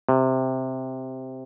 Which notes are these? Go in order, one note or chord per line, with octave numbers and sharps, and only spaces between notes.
C3